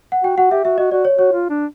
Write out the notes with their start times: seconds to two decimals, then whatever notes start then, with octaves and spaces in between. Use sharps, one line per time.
0.12 F#5
0.23 F#4 G5
0.37 F#4 F#5
0.51 G4 E5
0.64 F#4 E5
0.78 F#4 D#5
0.92 F#4 D5
1.05 C#5
1.19 F#4 C#5
1.32 F4
1.50 D4